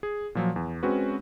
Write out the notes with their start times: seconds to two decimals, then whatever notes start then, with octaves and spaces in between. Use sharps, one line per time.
0.03 G#4
0.35 A#2 F3 F#3
0.56 E2
0.83 G#3 C4 C#4 F#4 B4